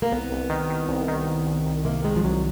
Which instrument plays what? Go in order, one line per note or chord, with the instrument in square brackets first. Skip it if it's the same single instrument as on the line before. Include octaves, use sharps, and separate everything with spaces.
[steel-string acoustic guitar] A#3
[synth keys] C2 [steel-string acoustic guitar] B3
[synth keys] C2
D#3
D#3
C2
D#3
C2
C2
C2
[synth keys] C3 [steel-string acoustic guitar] A#3
[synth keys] D#3 [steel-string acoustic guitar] G#3
[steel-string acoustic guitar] F3
[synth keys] C2 [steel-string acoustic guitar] F#3